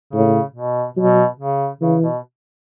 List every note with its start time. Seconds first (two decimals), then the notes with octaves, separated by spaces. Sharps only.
0.13 A2 C#3
0.55 B2
0.97 B2 F#3
1.39 C#3
1.81 C#3 E3
2.02 B2